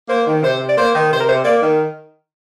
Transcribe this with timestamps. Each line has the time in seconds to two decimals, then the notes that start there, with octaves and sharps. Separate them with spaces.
0.09 A#3 C5
0.27 D#3
0.43 C3 C5
0.60 C3
0.69 D5
0.77 A#3 C5
0.95 D#3
1.11 C3 C5
1.19 A#4
1.28 C3 C5
1.44 A#3 D5
1.62 D#3